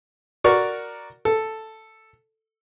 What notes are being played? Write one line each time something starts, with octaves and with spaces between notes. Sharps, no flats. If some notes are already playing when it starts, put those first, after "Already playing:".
F#4 A#4 D5 C#6
A4